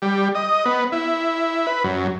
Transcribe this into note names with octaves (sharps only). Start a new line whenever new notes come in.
G3
D#5
B3
E4
B4
F#2